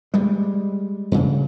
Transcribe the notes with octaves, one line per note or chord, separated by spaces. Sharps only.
G3 G#3
G2 C#3